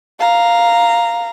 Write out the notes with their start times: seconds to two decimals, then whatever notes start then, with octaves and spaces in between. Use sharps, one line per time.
0.20 F5 A#5